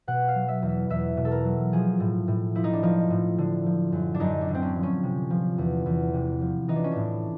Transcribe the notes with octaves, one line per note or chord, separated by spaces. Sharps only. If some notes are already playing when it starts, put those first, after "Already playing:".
B2 F#5
F5
F#3
E5
E2
E5
E2 E5
B2
A4
A#4
F#3
F3 G#4
A2
A2
F3 E4
D#4
D4
F3 D#4
A2
D3
F3
F#2
D4
F#2 D#4
D4
D3
C4
C#4
F3
C#4
C3
F3
E2
E2
C3
F3
E3 D#4
D4
C#4
A2 D4